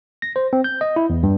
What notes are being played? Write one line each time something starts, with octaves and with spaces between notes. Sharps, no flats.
A#6
C5
C4
G6
D#5
E4
E2
G2